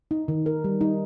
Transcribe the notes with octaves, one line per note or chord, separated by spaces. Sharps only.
D#4
D#3
A#4
G3
D#4